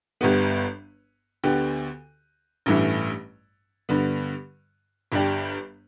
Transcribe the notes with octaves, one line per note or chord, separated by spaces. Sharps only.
G1 G2 G3 B3
D2 D3 B3 G4
A1 G2 E3 A3
G2 D3 B3
G1 G2 G3 D4 G4